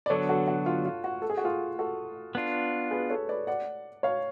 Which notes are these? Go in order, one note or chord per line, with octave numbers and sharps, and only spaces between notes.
D5
D3 F#3 B3 D4 A4 C#5
F#4 A4
F#4
F4
F4
F#4
A4
G#4
F#4
F4 G#4
F#4 A4
B3 D4 F4
G#4 B4
A4 C#5
B4 D5
D5 F#5
C#5 F5